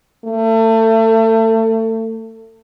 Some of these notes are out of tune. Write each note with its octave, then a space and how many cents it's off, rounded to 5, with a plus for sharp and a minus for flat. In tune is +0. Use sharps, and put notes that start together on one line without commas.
A3 +30